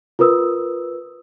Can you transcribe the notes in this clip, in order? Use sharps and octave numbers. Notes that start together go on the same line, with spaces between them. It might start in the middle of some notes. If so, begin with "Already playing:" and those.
F4 A#4 B4 D#6 E6